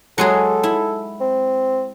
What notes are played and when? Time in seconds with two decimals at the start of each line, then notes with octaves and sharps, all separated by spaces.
0.18 F#3 G#3 G#4 A4
0.63 E4
1.20 C4